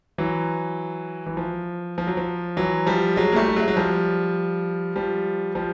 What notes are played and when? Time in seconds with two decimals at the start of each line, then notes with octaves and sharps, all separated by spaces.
0.18 E3 F#3
1.26 E3
1.37 F3
1.98 F3
2.07 F#3
2.17 F3
2.57 E3 F#3
2.87 F3 G3
3.16 F#3 G#3
3.32 A#3
3.36 G3 A3
3.48 G3
3.56 F#3 G#3
3.68 F#3
3.77 F3 G3
4.96 F3 G3
5.55 F3 G3